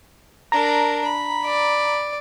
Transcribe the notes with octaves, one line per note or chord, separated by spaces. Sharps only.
D4 A#4 A#5
B5
D5